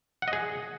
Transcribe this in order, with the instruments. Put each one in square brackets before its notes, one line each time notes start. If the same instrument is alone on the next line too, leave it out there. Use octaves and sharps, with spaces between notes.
[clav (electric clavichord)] F#5
D#5
G#4